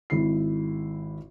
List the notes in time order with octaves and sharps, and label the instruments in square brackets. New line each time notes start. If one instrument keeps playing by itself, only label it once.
[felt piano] G#1 E4 C7